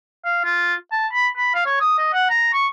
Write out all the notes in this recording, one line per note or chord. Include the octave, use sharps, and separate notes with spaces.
F5
F4
A5
B5
B5
F5
C#5
D#6
D#5
F#5
A#5
C#6